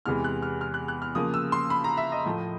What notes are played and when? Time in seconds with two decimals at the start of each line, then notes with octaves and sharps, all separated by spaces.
0.06 E2 C3 E3 G#3 F6
0.24 F#6
0.42 F6
0.61 F6
0.74 F#6
0.88 F#6
1.02 F6
1.15 C#3 F3 A#3 D#6
1.34 E6
1.52 C6
1.70 B5
1.84 A#5
1.97 E5
2.12 D#5
2.25 A2 F3 A3